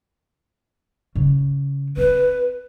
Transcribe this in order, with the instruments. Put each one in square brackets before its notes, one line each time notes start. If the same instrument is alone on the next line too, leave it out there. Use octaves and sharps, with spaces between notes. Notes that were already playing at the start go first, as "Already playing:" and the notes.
[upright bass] C#3
[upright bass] C4 [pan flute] B4